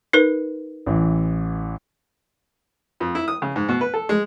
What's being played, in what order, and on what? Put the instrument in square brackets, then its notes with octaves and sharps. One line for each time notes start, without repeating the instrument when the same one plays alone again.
[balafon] D#4 A#4 B4
[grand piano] A1 E3
[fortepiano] F2
E4
D#6
C#3
G#2
B2
B4
A4
G#3